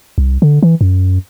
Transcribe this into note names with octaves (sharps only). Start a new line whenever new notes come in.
C2
D3
E3
F#2